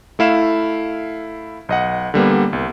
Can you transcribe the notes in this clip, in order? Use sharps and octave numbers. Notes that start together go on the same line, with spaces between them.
A3 E4 F5 E7
B1 D#5 F#5
D3 G3 A#3 B3
C2